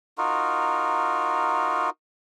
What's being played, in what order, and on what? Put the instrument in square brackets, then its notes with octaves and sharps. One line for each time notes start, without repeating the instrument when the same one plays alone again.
[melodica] D#4 F4 F#4 A#4